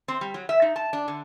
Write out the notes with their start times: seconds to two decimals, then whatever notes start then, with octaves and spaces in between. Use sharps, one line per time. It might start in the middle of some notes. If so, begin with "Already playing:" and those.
0.08 C4
0.21 G3
0.34 F#3
0.49 E5
0.62 D#4
0.76 A5
0.93 D4
1.08 D3